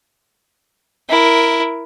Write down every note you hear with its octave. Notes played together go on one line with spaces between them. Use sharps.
E4 A#4